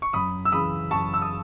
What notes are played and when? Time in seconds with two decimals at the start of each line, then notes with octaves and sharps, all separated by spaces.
0.02 C#6
0.13 F#2 B5 D#6
0.45 E6
0.52 C#3 E3 B5 D#6
0.91 F#2 A5 C#6
1.14 E6
1.22 D#6